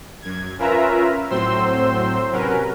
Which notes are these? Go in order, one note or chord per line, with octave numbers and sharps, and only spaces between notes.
F#2 G#6
C#4 F4 A#4 B4 E5 A#5
A2 F#3 C4 C5 C6 E6
C3 F#3 C#4 A#4 B4